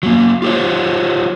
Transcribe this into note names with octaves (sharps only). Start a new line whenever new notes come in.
F#3 A#3
F4 G4 C5 C#5